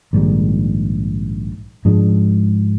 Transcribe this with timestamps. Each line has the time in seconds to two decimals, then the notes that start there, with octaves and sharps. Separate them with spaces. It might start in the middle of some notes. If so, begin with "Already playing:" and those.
0.13 A#1 G#2 D#3 G3
1.85 G#2 F3 G#3 D4